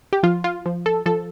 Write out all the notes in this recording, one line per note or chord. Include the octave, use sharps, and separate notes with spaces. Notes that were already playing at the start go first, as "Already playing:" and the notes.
G4
F3 F4
F4
F3
A4
F3 A4